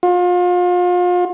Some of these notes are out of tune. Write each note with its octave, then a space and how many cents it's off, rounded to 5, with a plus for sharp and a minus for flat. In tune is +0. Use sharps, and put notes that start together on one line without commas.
F4 +35